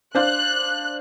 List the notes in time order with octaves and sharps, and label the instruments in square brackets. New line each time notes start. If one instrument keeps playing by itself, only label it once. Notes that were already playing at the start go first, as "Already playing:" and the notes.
[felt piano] D4 C5 F5 [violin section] F#6